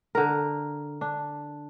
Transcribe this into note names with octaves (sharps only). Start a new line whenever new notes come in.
D3 A#4
D4